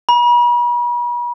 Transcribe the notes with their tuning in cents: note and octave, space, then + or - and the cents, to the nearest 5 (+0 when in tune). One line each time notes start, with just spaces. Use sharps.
B5 -45